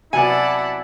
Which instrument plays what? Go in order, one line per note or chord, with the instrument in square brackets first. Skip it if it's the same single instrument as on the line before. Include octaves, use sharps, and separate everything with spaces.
[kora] C3 F#3 B3 [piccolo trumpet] E4 [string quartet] D5 F#5 A5 [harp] G#5